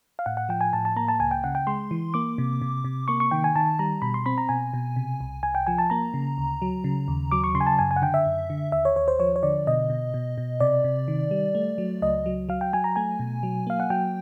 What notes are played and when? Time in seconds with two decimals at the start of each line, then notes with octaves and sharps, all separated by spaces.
0.19 F5
0.26 A2 F#5
0.37 F#5
0.49 F3 G5
0.61 G#5
0.73 A2 A5
0.85 A5
0.96 A#3 A#5
1.08 A5
1.20 C#2 G#5
1.31 G5
1.44 C#3 F#5
1.55 G5
1.67 G#3 C6
1.91 E3
2.14 A#3 D6
2.38 C3
2.61 C3
2.84 C3
3.08 A#3 C#6
3.20 C#6
3.31 D#3 G5
3.44 G#5
3.56 D#3 A5
3.79 G3 A#5
4.02 B2 B5
4.14 C6
4.26 C4 B5
4.38 A#5
4.49 B2 G#5
4.74 B2
4.96 C3
5.20 C2
5.43 C2 G#5
5.55 G5
5.67 F3 G#5
5.78 A5
5.90 A#3 A#5
6.14 C#3
6.38 D2
6.62 F#3
6.84 C#3
7.08 D#2
7.31 F#3 D6
7.44 C#6
7.55 C#3 C6
7.61 G#5
7.67 A5
7.79 F#2 G#5
7.91 G#5
7.96 F#5
8.02 D3 G5
8.14 E5
8.26 F#2
8.50 D3
8.72 D#2 E5
8.85 C#5
8.96 D#2 C#5
9.08 C5
9.20 F3 C#5
9.36 C#5
9.43 D3 D5
9.67 B2 D#5
9.90 B2
10.14 B2
10.38 B2
10.60 C3 D5
10.84 C3
11.08 D#3
11.31 G3
11.55 A3
11.78 F#3
12.02 C#2 D#5
12.26 F#3
12.49 F#3 F5
12.61 G5
12.73 F#3 G#5
12.84 A#5
12.96 A3 G#5
13.19 B2
13.43 F#3
13.67 A#3 F5
13.80 F#5
13.90 F#3 G5